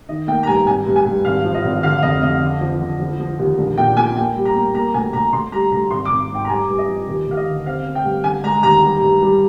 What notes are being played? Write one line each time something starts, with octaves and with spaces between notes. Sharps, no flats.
D#3 D#5
A#3 G5
A#5
G2 G#5
G#1 G#5
G2
G#5
G2
G#1 F5
F3
D#5
G#1
D3 F5
F2 D#5
F2 D#5
D3
F3
D3
F3
F3
D#2
A#1
A#2 G5
A#2 G#5
A#3 G5
G3
A#5
A#3
A#3 A#5
D2 G#5
D2 A#5
D2 C6
G3 A#5
D2 A#5
G#1 C6
D6
G#1
G#2 G5
A#5
G2 G#5
G2
D#5
F3
D#2
D#2 F5
D#5
D3
C4 F5
C4
G5
G2
D3 G#5
G#3 A#5
D#2 A#5
G3
G2
G3